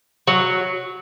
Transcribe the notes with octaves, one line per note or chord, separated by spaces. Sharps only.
F#3